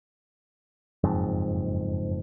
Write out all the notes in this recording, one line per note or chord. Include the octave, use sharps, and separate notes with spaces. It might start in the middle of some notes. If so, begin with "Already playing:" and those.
F#1 F2 G#2